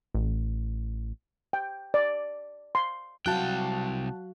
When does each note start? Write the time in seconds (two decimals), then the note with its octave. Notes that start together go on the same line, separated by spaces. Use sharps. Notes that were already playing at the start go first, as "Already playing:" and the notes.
0.14 A1
1.53 G5
1.94 D5
2.75 C6
3.26 C2 F#3 F#4 F5 G5 A5 F#6